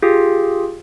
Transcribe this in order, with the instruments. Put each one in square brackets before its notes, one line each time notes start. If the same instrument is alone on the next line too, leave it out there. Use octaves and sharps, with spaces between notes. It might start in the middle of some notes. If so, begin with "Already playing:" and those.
[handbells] F4 G4 G#4